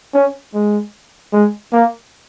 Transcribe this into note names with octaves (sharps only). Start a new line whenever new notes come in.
C#4
G#3
G#3
A#3